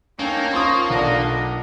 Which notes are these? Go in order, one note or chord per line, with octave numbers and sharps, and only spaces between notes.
A#3 C#4 D#4 A4 G5
F3 C#5 A5 C6 D#6
B1 D4 F4 D5 D#5 F#5